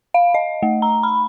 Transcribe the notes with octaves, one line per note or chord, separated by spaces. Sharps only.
F5
D#5
A3
A#5
B5